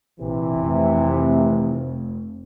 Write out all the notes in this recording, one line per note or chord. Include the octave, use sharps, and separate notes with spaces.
A#1 C3 E3
F1 F2